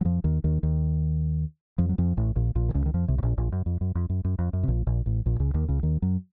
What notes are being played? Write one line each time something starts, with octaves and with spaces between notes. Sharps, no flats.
F#3
F2 F3
D#2 D#3
D#2 D#3
D#2 D#3
F2 F3
F#3
F2 F3
A1 A2
A#1 A#2
A#1 A#2
D#3
C#2 C#3
D#3
F2 F3
C2 C3
A2
A#1 A#2
A#1 A#2
F#2
F2
F#2
F2
F#2
F#2
F2
F#2
C3
A#1 A#2
A#1 A#2
A1 A2
A#1 A#2
C#2 C#3
D#2 D#3
C#2 C#3
D#2 D#3
F#2 F#3